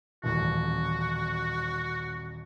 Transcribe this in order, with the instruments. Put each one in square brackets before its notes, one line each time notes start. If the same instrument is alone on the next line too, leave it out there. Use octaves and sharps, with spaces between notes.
[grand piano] D#1 A1 [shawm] F#4